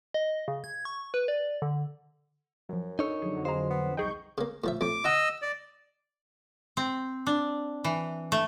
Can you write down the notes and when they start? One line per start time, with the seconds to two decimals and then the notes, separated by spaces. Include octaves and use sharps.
0.14 D#5
0.48 C#3
0.64 G#6
0.85 C#6
1.14 B4
1.28 D5
1.62 D3
2.69 F#2 F3 F#3
2.99 D4 D#4 A4 A#4 C#5
3.22 F2 D3 F#3 G#4
3.45 G#3 C5 F5 A#5
3.70 B3
3.97 C2 D#4 G#4 G5 C#6 G6
4.38 C#3 A#3
4.64 A2 F3 E5
4.81 F2 A2 D6
5.04 D#4 D#5 F#5 A#5 E6
5.42 D5
6.77 C4
7.27 D4
7.84 E3
8.32 A3